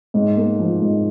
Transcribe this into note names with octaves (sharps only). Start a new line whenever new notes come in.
G#2
A#3
F3
G#2